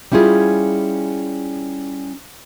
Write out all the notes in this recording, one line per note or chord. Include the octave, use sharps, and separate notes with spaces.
G3 C#4 E4 F4 G#4